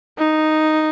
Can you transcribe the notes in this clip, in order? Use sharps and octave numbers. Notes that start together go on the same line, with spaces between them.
D#4